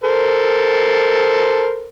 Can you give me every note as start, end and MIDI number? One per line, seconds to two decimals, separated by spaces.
0.04 1.89 69
0.04 1.89 70
0.04 1.89 72